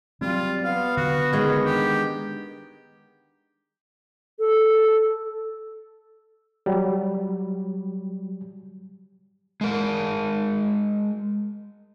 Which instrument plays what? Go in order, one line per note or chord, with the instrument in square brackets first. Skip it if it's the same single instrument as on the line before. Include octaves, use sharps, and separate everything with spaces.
[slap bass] F#3 C4 [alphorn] G3 [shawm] F4
[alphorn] B3 [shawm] F5
[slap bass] D3 [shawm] F#4
[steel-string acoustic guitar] D#3 G#3 [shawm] C#4
[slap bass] D4 [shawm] G4
[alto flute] A4
[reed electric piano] F#3 G3
[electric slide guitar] G#3 A#4